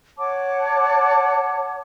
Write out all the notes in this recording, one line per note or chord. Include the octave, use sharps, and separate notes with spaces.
C#5 F#5 A5 D6